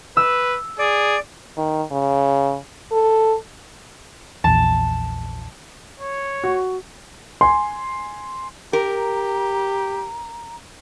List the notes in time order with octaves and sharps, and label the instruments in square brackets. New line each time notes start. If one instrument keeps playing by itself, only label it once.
[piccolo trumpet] B4 [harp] E6
[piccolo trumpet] G#4 [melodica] D5
[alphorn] D#3
C#3
A4
[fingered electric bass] A#1 E2 [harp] A5
[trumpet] C#5
[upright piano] F#4
[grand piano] G#5 C6
[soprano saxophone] G4 [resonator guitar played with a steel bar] A#4 [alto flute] A#5